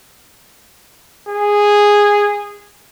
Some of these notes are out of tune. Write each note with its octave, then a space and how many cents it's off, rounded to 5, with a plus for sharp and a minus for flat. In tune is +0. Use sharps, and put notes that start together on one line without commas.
G#4 -10